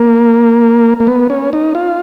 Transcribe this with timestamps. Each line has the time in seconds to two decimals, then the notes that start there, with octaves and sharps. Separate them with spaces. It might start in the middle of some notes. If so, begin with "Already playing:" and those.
Already playing: A#3
1.00 A#3
1.07 B3
1.30 C#4
1.53 D#4
1.75 F4